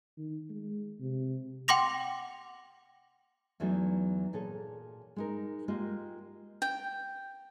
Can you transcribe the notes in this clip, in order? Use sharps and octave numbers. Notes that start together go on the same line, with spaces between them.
D#3
G#3
C3
F#5 G5 C6 D6 A#6 F7
E2 E3 F#3 A3 D4 D#4
A#2 G#4 A4 C#5
G#3 D#4 A#4
G#3 A#3 F4 G4 D#5
G5